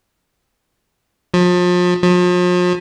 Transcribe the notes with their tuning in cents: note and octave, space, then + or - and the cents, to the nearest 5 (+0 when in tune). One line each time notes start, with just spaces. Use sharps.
F3 +35
F3 +40